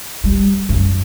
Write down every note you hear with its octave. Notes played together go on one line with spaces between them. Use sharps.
G3
F#2